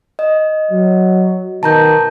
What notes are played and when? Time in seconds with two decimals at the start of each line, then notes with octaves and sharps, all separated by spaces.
0.19 D#5
0.71 F#3
1.63 B2 D#3 A5 A#5 G6